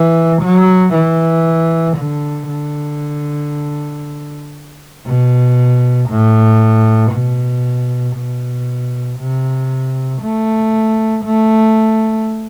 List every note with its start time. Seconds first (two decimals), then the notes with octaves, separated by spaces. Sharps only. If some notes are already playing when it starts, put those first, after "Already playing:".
Already playing: E3
0.42 F#3
0.94 E3
1.97 D3
2.49 D3
5.07 B2
6.10 A2
7.13 B2
8.16 B2
9.19 C3
10.22 A3
11.25 A3